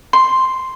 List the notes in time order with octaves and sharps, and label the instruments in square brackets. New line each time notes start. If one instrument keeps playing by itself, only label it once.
[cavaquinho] C6